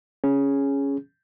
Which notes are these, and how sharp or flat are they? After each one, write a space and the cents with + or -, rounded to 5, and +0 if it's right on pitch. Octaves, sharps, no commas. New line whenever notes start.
C#4 +0 G#4 +0